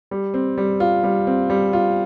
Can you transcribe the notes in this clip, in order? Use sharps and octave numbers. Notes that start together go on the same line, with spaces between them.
G3
C4
G3
F4
G3
C4
G3
F4